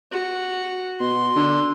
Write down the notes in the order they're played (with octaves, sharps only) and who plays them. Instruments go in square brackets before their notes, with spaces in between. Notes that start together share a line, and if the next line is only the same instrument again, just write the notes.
[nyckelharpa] F#4
[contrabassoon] B2 [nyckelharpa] C6
[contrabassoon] D3